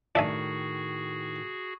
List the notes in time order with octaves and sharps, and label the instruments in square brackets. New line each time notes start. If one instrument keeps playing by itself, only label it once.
[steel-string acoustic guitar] A2 D#3 [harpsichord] D4 E5 G#5 [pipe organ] F#4 G#4